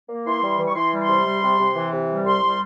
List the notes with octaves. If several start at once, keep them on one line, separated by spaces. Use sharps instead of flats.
A#3
E3 C6
G3
E3
C#6
E3 C6
G3
C6
C3
G3
C3
C3
E3
C3
G3
C2 C6
G3